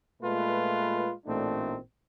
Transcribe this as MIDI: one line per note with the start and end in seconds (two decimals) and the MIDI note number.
0.22 1.11 46
0.22 1.11 56
0.22 1.11 57
0.22 1.11 65
0.22 1.11 71
1.26 1.77 33
1.26 1.77 46
1.26 1.77 57
1.26 1.77 60
1.26 1.77 62
1.26 1.77 63